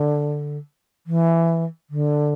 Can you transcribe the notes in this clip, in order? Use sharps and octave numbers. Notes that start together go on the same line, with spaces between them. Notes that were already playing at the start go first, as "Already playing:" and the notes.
Already playing: D3
E3
D3